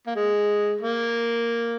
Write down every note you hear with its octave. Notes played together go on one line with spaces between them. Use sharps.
A#3
G#3
A#3